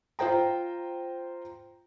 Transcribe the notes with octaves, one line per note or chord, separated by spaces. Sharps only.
F4 C5 G5 A#5